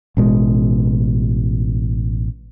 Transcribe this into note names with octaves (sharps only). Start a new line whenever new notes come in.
A1 B2 G#3